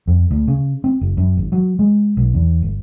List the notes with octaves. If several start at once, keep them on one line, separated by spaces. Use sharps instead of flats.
F2
D2
C#3
C4
F#1
F#2
G#1
F#3
G#3
B1
E2
G1